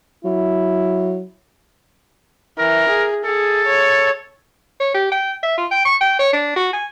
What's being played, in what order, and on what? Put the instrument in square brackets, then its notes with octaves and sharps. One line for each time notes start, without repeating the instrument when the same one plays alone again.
[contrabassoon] F#3 [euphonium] E4
[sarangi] E3 [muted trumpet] A#4
[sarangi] G#4
[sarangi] G#4 [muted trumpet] A4
[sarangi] C#5
[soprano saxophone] C#5
G4
G5
E5
F4
G5
C#6
G5
C#5
D4
F#4
G#5